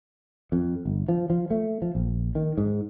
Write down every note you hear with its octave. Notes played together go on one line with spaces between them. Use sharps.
F2
G1
F3
F3
A3
F3
A#1
D#3
G#2